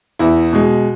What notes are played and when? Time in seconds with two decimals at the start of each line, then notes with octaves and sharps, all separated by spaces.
0.19 E2 E4
0.53 B2 G#3